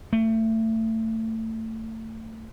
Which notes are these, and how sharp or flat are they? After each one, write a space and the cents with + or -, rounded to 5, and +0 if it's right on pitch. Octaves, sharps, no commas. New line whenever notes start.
A3 +25